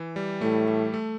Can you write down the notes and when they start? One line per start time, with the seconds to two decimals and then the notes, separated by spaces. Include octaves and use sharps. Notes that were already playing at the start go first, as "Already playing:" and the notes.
Already playing: E3
0.16 G3
0.41 A2 A3
0.68 G3
0.94 A3